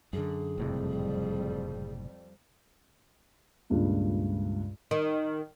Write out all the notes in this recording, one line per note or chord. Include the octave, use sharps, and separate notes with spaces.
F#2 D3 G#4
F#1 F2 A2 C3 G3
C#2 G2 A#2
D#3